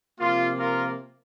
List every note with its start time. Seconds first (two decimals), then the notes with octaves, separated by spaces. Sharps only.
0.20 C3 F3 A#3 F4
0.58 F4 A#4